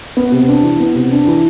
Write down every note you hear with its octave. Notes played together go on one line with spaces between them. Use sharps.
B3
C3
D4
E3
B3
C3
D4
E3